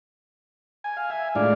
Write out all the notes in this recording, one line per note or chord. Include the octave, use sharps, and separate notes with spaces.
G#5
F5
E5 G#5
A2 G#3 D4 F4 D5 F5